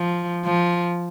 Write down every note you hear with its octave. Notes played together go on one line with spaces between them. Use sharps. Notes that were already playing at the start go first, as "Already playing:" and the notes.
Already playing: F3
F3